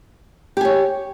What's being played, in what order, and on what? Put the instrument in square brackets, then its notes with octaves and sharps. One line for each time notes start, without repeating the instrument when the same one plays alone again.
[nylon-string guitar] G4
G#5
C#5